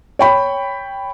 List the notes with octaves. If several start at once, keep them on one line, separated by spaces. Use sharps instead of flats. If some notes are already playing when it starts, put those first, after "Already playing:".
C#5 G5 B5